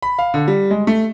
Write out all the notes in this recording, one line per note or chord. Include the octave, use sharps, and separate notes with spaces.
B5
F5
D3
G3
G#3
A3